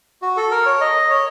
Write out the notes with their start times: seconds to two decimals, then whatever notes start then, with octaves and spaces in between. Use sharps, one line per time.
0.22 F#4
0.37 A4
0.51 A#4
0.66 C#5
0.81 D#5
1.10 C#5